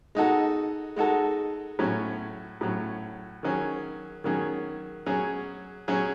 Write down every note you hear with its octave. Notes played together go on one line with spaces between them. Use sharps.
G#3 D#4 F#4 A4
G#3 D#4 F#4 A4
A2 F#3 C#4
A2 F#3 C#4
D#3 F#3 C#4 G#4
D#3 F#3 C#4 G#4
F#3 C#4 G#4
F#3 C#4 G#4